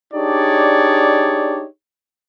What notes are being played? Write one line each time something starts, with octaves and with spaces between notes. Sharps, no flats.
D4 D#4 G4 G#4 C#5 D5